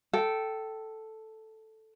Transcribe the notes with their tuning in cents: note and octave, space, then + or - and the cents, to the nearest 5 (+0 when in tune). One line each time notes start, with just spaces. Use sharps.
A4 +0 G5 -15